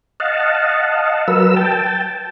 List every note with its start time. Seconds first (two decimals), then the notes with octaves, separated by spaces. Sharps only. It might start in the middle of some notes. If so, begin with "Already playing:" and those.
0.20 D#5 F5 F#5 A5
1.28 F#3 A#4 B4 E6
1.56 G5 A5